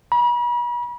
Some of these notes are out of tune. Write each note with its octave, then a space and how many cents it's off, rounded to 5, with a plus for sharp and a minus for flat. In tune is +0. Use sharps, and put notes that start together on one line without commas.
B5 -40